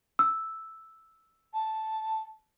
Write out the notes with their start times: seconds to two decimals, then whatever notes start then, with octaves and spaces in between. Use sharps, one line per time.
0.19 E6
1.54 A5